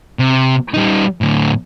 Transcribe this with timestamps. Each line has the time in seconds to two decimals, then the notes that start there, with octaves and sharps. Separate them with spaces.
0.19 C3
0.74 G3 D#4
1.21 D2 A2